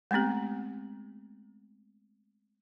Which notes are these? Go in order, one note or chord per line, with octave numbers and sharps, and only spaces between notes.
G#3 A3 B3 C4 G4